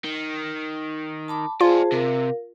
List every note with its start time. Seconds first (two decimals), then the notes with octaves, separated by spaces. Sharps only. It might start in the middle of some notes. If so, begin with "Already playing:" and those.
0.04 D#3
1.28 A5 B5 D6
1.61 F4 G#4 C5 D5 G#5 A5
1.92 C3 A#4 F5